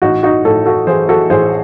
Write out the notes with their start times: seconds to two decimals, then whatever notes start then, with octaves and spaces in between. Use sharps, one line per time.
0.02 A1 D#4 F#4
0.23 D#4 F#4
0.44 A2 F#4 A4
0.66 F#4 A4
0.87 E3 G#4 C5
1.09 F#4 A4
1.30 A1 G#4 C5